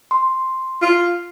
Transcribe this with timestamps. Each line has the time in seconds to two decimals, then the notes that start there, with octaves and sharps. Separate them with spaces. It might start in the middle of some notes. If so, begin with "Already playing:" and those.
0.11 C6
0.82 F4